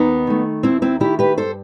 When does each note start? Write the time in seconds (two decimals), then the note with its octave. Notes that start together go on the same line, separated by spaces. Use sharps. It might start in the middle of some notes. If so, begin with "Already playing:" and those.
Already playing: D#2 B3 D#4
0.27 D#3 A3
0.63 D#2 C4 E4
0.82 C4 E4
1.00 D#3 A3 E4 G4
1.19 G4 B4
1.38 G2 A4 C5